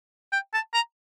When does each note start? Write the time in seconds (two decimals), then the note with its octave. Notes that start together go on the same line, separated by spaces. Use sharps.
0.32 G5
0.54 A5
0.74 A#5